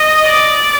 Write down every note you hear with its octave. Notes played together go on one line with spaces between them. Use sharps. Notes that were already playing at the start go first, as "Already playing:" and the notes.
Already playing: D#5
D5